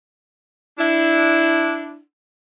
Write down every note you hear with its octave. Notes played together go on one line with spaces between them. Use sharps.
D4 E4